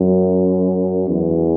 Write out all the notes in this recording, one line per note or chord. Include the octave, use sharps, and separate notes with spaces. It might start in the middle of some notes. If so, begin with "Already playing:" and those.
Already playing: F#2
E2